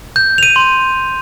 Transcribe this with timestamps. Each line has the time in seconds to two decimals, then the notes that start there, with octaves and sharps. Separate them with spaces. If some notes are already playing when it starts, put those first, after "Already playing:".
0.16 G6
0.38 F7
0.43 D#7
0.56 C6